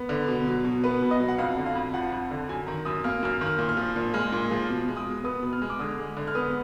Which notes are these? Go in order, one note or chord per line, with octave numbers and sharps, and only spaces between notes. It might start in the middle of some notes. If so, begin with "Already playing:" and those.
Already playing: B3
D3
B2
F#3
B2
B3 B4
B2
D#5
F#3
F#5
F2 F5
D3
F5
F2
F3 F#5
F2
D3
F#2 G#5
D#3 A#5
F#2 D#6
A#3 F6
F#2 F6
D#3
F6
A#2
F6
F3
A#2
G#3 F6
A#2
F3
B2
G#3
D#6
B2
B3 D#6
B2
F6
G#3
D6
D3 D#6
G#3
D3
F6
B3 D#6